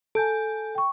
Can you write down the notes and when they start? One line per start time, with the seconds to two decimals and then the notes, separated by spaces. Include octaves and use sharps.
0.15 A4 G#5 G6 D7
0.75 G5 C#6